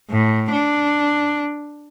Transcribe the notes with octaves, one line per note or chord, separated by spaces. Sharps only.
A2
D4